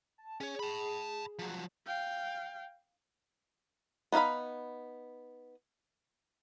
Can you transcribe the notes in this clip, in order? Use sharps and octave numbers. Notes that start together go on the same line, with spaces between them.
A5
C#4 G#4 C#5
A5 B5
F3 F#3
F5 G5
B3 D#4 E5 F5 B5